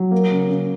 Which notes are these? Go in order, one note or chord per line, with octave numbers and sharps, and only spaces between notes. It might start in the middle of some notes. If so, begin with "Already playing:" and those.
Already playing: F#3
A#3
C#3
C#3